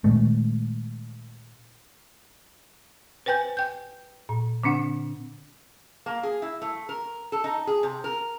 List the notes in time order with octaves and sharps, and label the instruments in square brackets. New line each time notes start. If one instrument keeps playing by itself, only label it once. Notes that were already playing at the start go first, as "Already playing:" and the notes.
[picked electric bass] A#2 D#3 G#3 A3
[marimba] B4 C5 G5 G#5 G6
G5 G6
A#2
D3 C4 D4 F#5
[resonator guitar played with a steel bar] A#3
G#4
E4
A3
A#4
A4
D#4
G#4
C3
A#4